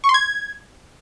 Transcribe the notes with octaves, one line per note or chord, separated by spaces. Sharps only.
C#6
C6
G#6